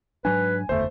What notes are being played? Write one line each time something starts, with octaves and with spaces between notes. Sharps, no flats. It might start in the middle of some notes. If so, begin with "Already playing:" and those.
G#2 F#3 D4 B4 G#5
F#1 E2 D3 A3 C5